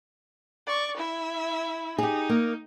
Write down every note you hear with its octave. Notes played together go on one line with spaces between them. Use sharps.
D5 C#6
E4 E5
D#4 G4 G#4
A#3